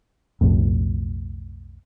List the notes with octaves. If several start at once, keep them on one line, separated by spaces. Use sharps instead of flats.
B1 F2 A2